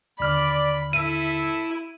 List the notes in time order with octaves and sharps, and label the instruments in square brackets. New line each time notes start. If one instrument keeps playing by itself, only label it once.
[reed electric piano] D#2 D3 F6 [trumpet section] D5 [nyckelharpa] B5
[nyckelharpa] E4 [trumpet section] A4 E5 [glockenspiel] D#7